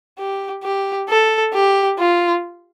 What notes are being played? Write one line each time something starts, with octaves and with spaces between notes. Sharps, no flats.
G4
G4
A4
G4
F4